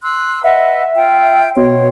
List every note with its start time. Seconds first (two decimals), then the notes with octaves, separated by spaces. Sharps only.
0.03 C6 E6 F#6
0.44 B4 D#5 E5 F#5
0.95 F4 G5
1.57 B2 C#5 C6